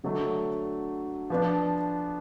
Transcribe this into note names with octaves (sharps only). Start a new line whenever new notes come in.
D3 F#3 A3 D4
F3 B3 D4